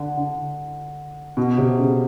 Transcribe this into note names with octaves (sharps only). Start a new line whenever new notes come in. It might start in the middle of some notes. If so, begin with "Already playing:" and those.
Already playing: D3
D3
B2
C3
C#3